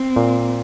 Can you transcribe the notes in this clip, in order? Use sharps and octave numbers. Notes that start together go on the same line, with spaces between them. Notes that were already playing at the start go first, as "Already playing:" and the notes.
Already playing: C4
A#2